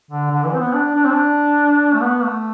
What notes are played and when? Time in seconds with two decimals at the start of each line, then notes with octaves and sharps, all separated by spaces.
0.11 D3
0.31 D3
0.45 E3
0.54 C4
0.59 B3
0.73 D4
0.95 D4
1.05 C4
1.13 D4
1.93 A3
2.01 B3
2.23 A3